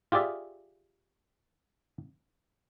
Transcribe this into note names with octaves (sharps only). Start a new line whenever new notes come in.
F4 G4 G#4 D5 E5